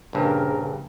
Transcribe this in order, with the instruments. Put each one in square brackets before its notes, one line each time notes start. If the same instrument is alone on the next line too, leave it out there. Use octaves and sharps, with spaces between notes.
[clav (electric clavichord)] A#1 G2 [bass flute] C#3 [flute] A#4